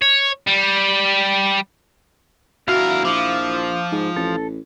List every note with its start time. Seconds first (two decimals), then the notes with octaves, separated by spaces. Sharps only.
0.02 C#5
0.47 G3
2.68 D2 E4 F#4 A#4 F5
3.05 A#1 F3 D6 F6
3.92 G#2
4.16 A1 A4